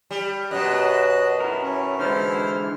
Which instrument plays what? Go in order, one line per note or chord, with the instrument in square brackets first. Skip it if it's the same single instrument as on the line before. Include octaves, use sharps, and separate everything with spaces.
[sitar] G3
[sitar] F#2 B2 [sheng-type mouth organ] D#5 F#6
[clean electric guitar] E4 A#4
[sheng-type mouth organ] C#4
[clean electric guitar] D3 E3 G#3 [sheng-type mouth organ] E4 C5 F6